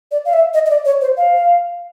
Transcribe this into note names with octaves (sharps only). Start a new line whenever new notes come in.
D5
F5
E5
D#5
D#5
D5
C#5
C5
F5